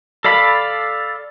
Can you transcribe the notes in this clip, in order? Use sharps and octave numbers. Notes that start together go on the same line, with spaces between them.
A4 D5 F5 B5